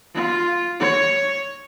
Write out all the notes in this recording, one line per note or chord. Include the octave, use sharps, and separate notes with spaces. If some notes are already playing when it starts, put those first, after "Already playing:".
F4
C#5